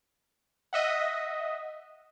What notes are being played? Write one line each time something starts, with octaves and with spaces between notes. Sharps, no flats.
D#5 E5 F#5